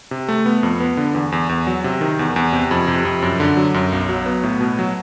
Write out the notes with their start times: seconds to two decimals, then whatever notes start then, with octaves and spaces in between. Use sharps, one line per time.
0.11 C3
0.28 A3
0.46 B3
0.63 F2
0.80 B3
0.97 D3
1.15 E2
1.32 E2
1.49 E2
1.67 F#3
1.84 C3
2.01 D#3
2.19 E2
2.36 E2
2.53 C3
2.71 F2
2.87 C3
3.05 F2
3.22 F#2
3.40 D3
3.57 F#3
3.74 F#2
3.92 B1
4.09 F#3
4.26 B3
4.43 A2
4.61 B2
4.79 F#3